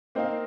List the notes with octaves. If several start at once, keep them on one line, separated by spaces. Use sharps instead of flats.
A#3 C4 D#4 A#4 F5